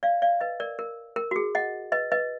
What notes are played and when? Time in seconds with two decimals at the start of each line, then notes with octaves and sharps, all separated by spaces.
0.03 D5 F5
0.22 D5 F5
0.41 B4 D#5
0.60 A#4 D5
0.79 A#4
1.16 A#4
1.31 F#4
1.36 G#4
1.55 D#5 F#5
1.92 B4 D#5
2.12 B4 D#5